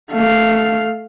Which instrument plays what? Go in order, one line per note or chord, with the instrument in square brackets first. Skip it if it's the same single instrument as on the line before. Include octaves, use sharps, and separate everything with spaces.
[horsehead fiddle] A3 F5